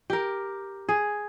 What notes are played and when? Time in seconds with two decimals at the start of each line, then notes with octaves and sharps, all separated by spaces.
0.10 G4 A#4
0.89 G#4